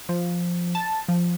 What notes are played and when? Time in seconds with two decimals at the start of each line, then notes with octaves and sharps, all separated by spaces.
0.09 F3
0.75 A5
1.08 F3